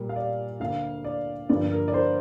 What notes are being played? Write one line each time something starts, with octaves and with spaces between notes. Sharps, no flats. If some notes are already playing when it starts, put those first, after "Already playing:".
Already playing: A#2 G3 A#3
F5
D5
D2 D3 A#3 F5
D5
G2 D3 F3 A#3 D5
A#4
D5
C5